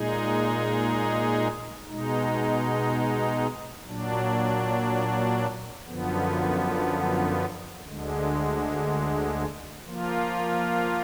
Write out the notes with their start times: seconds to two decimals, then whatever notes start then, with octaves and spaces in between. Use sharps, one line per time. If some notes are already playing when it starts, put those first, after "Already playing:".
Already playing: A#2 G#3 D#4 G#4
1.87 B2 G#3 D#4
3.87 A#2 F#3 D4
5.86 F#2 D3 F3 B3
7.86 D2 D3 G#3
9.84 F3 A#3 F4